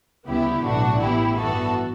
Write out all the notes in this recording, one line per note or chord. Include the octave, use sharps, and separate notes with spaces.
D2 C#3 G3 B3 E4 G4
B1 A2 E3 A3 D4 F#4
A1 A2 E3 B3 E4 G4
G2 E3 B3 F#4 A4